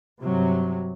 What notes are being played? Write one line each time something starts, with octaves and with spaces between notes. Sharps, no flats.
G2 C3 F#3